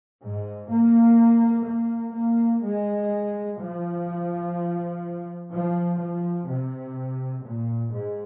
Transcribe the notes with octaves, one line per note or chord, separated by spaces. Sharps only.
G#2
A#3
A#3
A#3
G#3
F3
F3
F3
C3
A#2
G#2